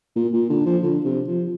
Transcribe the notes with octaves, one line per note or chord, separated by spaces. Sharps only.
A#2
A#2
D3
F3
D3
C3
F3